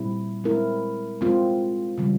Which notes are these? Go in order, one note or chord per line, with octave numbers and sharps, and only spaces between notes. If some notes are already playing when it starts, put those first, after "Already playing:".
Already playing: A#2 G3 C4 E4
G#3 C4 E4 A#4
G#3 C4 F4
C#3 E3 G3